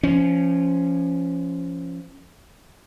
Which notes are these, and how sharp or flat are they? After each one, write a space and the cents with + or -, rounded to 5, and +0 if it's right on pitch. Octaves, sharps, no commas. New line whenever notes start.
F3 -20 C#4 +0